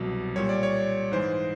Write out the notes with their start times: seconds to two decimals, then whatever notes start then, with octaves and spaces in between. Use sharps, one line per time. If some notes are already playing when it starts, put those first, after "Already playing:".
Already playing: C2 B2 F#3
0.36 A#2 G3 C#5
0.49 D5
0.63 C#5
1.12 G#2 E3 G#3 C5